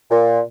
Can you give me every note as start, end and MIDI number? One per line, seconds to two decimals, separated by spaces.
0.10 0.40 46